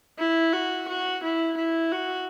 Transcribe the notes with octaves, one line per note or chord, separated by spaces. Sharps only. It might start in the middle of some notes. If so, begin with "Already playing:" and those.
E4
F#4
F#4
E4
E4
F#4